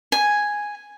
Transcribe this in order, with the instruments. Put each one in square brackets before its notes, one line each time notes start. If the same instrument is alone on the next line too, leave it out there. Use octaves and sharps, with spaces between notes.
[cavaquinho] G#5